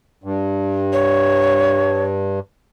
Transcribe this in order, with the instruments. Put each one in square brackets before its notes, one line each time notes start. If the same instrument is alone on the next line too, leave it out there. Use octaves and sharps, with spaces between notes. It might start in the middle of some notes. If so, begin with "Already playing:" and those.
[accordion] G2
[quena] C#5